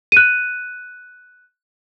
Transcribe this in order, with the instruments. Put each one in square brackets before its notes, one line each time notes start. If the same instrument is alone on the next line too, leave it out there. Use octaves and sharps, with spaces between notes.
[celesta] F#6 D#7